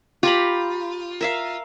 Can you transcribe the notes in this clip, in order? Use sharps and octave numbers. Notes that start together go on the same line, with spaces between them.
F4 G4 A#5 B5
A#4 E5 F5